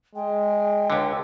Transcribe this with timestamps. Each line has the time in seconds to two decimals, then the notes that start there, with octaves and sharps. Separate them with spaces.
0.15 G#3 G5
0.90 C#2 D3